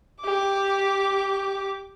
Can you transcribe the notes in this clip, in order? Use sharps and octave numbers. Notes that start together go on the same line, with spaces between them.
G4 D6